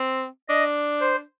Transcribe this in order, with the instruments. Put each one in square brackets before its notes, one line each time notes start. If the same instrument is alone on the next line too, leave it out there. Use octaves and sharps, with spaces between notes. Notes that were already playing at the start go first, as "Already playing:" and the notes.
Already playing: [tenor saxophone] C4
[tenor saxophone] D4 [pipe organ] D#5
[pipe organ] C5